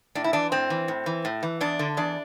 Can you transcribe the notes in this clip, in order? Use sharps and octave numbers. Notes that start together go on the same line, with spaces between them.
A2 D4
E4
E3 D4
A2 C4
E3
A2
E3
A2
E3
E2 D4
D3
E2 D4